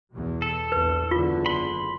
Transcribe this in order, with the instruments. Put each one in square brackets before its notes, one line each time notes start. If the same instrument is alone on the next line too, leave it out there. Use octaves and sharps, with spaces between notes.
[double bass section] E2 B2
[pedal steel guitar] A4
[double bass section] A#1 E2 [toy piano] B4
[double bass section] F#1 E2 D3 [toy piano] F4
[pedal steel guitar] B5 C6